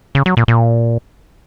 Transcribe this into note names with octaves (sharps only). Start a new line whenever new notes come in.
C#3
F#3
A#2
A#2